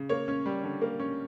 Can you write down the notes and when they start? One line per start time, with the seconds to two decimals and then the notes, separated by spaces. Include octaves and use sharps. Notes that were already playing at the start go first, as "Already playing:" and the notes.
Already playing: C#3
0.09 A#3 C#5
0.28 C#4
0.46 G3
0.63 D3
0.81 A#3
1.00 C#4